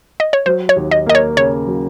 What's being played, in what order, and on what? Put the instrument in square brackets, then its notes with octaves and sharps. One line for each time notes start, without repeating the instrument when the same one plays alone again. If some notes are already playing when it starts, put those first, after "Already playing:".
[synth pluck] D#5
C#5
[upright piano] F#3 [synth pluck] C5
[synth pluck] C#5
[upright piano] D#2
[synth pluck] D#5
[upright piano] A#3 [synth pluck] D#5
[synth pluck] C#5
[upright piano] C#3 [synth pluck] C#5
[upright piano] F#3